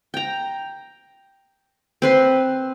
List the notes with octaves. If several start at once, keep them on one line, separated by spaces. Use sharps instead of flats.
G5 A#5
C4 B4 C6